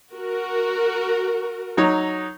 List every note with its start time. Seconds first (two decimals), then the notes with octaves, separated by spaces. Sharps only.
0.14 F#4 A#4
1.77 F#3 D#4 C#5